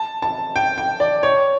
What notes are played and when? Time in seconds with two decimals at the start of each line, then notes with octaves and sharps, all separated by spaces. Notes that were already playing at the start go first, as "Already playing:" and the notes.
Already playing: A5
0.22 A5
0.56 G5
0.78 G5
1.00 D5
1.23 C#5